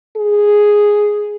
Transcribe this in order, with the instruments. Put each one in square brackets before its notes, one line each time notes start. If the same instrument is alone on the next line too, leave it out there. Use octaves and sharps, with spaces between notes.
[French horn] G#4